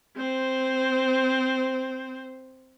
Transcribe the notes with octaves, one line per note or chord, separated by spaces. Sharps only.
C4 C5